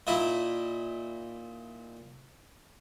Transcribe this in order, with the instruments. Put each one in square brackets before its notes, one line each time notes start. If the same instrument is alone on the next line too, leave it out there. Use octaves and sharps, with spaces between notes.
[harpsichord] A#2 D#4 E4